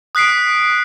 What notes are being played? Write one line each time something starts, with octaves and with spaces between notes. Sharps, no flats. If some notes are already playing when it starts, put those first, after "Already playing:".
D#6 F#6 B6 C7 D7